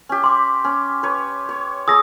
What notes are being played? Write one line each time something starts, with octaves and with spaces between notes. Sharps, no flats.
C#4 G4
C6 D6
C#4
B4 C#5
C#5
G#4 C#5 B5 D#6 E6 A#6